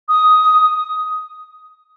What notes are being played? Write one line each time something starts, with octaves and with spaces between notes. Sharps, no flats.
D#6